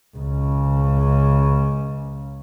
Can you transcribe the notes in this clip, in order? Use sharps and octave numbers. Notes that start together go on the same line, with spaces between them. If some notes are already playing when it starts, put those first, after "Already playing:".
C#2 C#3